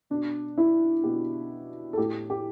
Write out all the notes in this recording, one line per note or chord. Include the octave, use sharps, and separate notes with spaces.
B2 D4
E4
B2 G4
A4
A2 G4
G4